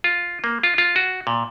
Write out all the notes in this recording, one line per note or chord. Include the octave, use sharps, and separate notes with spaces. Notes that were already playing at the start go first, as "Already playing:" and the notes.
F4
A#3
F4
F4
F#4
A#2